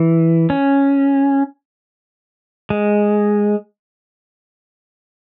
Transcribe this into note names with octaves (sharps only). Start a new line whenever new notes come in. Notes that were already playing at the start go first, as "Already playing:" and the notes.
Already playing: E3
C#4
G#3